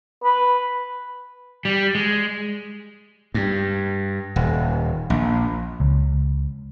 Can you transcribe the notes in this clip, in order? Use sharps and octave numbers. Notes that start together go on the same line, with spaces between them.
B4
G3
G#3
G2
D#1
A#1
C#2